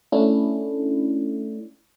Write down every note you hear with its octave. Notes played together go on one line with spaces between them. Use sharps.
A3 C#4 D4 E4